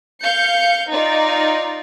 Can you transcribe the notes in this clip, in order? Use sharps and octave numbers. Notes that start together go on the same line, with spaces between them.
F5 G6 C#7
D#4 F4 D5